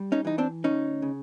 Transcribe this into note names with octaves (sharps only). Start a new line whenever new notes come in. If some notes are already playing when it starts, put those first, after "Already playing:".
Already playing: G3
C#4 D#4
E3 D#4
C4 D4
D2 C#4 D#4
C#3